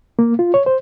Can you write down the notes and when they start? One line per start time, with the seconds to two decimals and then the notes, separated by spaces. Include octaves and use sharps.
0.19 A#3
0.39 F4
0.54 C#5
0.66 C5